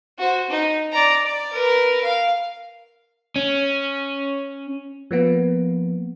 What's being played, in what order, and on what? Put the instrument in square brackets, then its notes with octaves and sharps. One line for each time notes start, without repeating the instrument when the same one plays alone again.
[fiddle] F#4 C5
D#4
D5 A#5
D5
A#4 B4
F5
[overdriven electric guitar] C#4
[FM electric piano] F3 A#3 B3